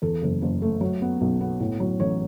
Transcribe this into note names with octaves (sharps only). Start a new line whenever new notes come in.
E2 A4
F#1
F#1
A3
F#3
B3
B1
B3
A2
F#3
A1 C#5